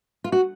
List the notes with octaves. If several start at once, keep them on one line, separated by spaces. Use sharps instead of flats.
F4
F#4